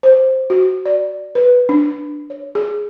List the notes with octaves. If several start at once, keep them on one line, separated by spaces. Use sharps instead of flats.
C5
F#4
D5
B4
D4
C#5
G#4